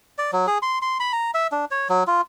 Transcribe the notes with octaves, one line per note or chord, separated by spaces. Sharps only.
D5
F#3
G#4
C6
C6
B5
A#5
E5
D4
C#5
F#3
F4